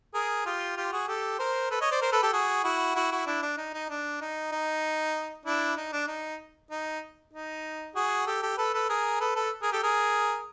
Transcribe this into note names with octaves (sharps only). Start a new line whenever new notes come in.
G#4 A#4
F4 G4
F4 G4
F#4 G#4
G4 A4
A#4 C5
A4 B4
C#5 D#5
C5 D5
A#4 C5
A4 B4
G4 A4
F#4 G#4
E4 F#4
E4 F#4
E4 F#4
D4 E4
D4
D#4
D#4
D4
D#4
D#4
D4 E4
D#4
D4
D#4
D#4
D#4
F#4 G#4
G4 A4
G4 A4
A4 B4
A4 B4
G#4 A#4
A4 B4
A4 B4
G#4 A#4
G4 A4
G#4 A#4